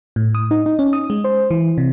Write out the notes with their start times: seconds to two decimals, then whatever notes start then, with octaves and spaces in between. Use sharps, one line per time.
0.16 A2
0.35 D#6
0.51 D#4
0.66 D#4
0.79 C#4
0.93 D#6
1.10 G#3
1.24 C5
1.51 E3
1.78 C3